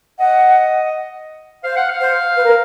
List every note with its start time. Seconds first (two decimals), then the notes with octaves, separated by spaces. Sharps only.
0.19 D#5 F#5
1.64 C5 F5
1.76 F#5
1.89 F5
2.00 C5
2.36 B4
2.44 A#4